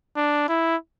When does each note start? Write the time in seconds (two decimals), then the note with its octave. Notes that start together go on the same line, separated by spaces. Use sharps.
0.16 D4
0.48 E4